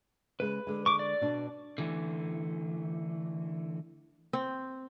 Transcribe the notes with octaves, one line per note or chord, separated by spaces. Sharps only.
C#3 G#3 B4
D3 G#3
C#6 D6
D5
B2 D4
D3 E3 A3
C4